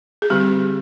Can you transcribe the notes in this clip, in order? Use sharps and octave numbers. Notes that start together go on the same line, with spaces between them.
G#4
D3 G3 C4 G4